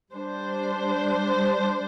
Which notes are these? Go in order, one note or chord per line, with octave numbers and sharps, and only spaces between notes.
G3 D4 C5